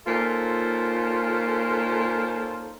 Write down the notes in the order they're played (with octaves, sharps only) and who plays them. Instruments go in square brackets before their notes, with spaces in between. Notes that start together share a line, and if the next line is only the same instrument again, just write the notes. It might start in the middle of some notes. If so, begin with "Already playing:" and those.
[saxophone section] A#2 C#4 D#4 F4 A4 C5